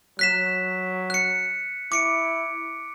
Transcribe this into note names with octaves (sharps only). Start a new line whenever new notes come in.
F#3 F#6 B6 E7
F#6 C#7
E4 D6 C#7 D7